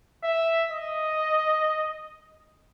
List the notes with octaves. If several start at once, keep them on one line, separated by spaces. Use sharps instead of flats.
E5
D#5